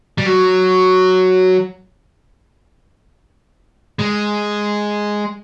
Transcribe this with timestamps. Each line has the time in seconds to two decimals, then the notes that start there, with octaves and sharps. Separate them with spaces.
0.18 G3
0.26 F#3
3.99 G#3